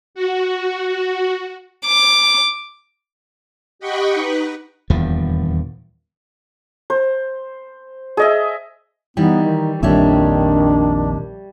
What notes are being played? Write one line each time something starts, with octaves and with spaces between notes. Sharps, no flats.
F#4
D6
G4 D#5 F#5 G5 B5 C#6
D#4 B4
D#1 E2 G2 F3
C5
G#4 D#5 E5
E3 G3 B3 D#4
D#3
A#1 F2 D#3 G3 D4 C#5 E5